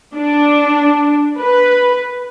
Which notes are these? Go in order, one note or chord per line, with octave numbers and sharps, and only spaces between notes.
D4
B4